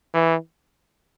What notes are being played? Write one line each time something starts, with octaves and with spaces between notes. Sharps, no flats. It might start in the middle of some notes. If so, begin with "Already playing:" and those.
E3